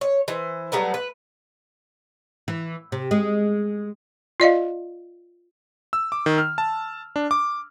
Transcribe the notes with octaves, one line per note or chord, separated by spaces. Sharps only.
C#5
E3 C5
F#3 G3 A3 B3
B4
E3
C3
G#3
F4 D5 D#5 F5
E6
D6
D#3
F6
A5
D4
D6